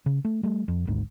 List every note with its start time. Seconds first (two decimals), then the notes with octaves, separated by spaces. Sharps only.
0.06 C#3
0.25 A3
0.43 G3 A3
0.68 F2
0.87 G#1 D2 G#2